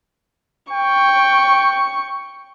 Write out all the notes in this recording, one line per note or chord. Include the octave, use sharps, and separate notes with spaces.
G5 C#6